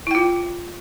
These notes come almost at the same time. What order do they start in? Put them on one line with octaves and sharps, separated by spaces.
E4 G5 F4